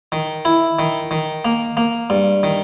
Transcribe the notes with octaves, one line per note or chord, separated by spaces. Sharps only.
D#3
E4
D#3
D#3
A#3
A#3
G2
D#3